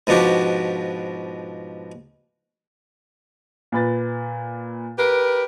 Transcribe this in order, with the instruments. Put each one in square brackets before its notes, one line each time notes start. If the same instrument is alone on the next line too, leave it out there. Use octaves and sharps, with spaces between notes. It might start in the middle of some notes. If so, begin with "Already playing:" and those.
[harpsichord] G#2 B2 F3 D4 F#4 G4
[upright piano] A#2 B4 A6
[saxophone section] G4 A#4 B4